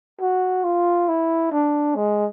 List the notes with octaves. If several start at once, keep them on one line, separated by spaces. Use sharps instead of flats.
F#4
F4
E4
D4
G#3